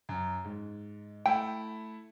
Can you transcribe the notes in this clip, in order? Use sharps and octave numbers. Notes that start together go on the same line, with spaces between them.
F#2
G#2
A3 E4 G5